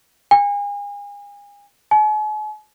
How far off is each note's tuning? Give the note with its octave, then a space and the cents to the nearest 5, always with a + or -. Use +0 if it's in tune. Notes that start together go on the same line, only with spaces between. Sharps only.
G#5 -35
G#5 +45